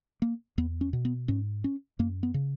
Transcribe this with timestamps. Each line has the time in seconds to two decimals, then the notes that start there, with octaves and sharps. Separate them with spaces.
0.22 A#3
0.58 E2 B3
0.81 C#4
0.93 B2
1.05 B3
1.28 G#2 C#4
1.64 C#4
1.99 F#2 A#3
2.23 B3
2.34 C#3